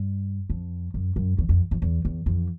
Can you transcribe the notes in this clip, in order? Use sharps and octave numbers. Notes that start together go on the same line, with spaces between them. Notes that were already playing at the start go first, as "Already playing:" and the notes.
Already playing: G2
F2
F#2
F#2
E2
F2
F2
E2
E2
F2